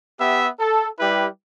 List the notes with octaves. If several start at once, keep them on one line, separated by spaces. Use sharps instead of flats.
B3 G4 E5
A4
G3 E4 G4 B4